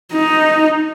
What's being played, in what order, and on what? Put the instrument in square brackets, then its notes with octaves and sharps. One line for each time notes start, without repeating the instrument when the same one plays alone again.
[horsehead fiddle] D#4